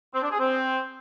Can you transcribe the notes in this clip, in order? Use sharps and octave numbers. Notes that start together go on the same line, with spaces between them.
C4
D4
G#4
C4